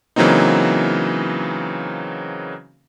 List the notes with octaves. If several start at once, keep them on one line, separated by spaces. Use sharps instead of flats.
C#3 E3 F#3 A#3 C4 D#4